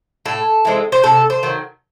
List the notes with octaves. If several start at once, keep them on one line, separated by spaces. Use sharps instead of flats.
A2 A4
E3 G#3 C4
C5
C3 A4
C5
D#3 F#3